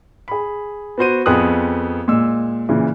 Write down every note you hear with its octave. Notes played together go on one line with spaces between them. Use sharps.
G#4 B5
B3 F#4 C5 D#7
F2 B3 F4 G#4 D#6 F#6
A#2 G#3 E6
A#2 C#3 E3